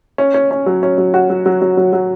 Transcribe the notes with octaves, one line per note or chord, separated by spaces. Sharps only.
C#4
C#4
C#4
F#3
C#4
F#3
F#4
F#3
F#3
F#3
F#3
F#3